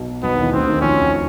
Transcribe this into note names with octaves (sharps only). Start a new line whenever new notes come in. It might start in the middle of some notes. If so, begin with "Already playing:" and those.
Already playing: B1 B2
B1 B2 B3
D#2 D#3
E2 E3
D2 D3 C4
D#2 D#3
F2 F3 C#4